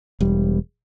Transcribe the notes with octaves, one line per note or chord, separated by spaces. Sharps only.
E1 G3